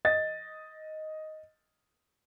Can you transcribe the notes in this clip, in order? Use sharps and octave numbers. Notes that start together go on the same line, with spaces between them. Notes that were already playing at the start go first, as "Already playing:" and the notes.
D#5 A6